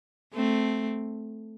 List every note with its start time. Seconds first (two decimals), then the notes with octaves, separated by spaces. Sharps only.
0.34 A3 C4